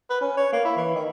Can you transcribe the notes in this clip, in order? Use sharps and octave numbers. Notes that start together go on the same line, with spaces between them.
B4
C#4
C#5
A#3
E4
E3
D#3